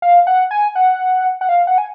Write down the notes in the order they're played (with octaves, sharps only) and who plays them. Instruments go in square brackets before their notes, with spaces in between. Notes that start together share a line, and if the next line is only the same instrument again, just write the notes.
[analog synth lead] F5
F#5
G#5
F#5
F#5
F5
F#5
G#5